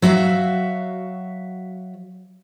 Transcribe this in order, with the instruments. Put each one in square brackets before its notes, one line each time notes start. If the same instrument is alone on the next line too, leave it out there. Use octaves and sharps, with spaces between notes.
[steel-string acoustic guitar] F#3 F#4 E5 F5